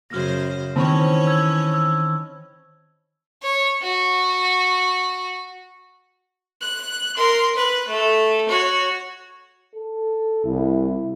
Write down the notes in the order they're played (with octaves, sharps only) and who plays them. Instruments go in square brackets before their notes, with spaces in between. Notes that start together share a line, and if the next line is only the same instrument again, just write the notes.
[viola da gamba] F#2 C#3 C5 [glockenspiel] F6 A#6
[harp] D#3 C4 [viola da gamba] E3 C#4 C#5 [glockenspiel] A5 B5 C#6
[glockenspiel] E6 G#6
E6
[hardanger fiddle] C#5
F#4
[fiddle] F#6
A#4 C6
B4 F#6
A3 A4
F#4 C#5
[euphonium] A4
[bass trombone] C2 [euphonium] E4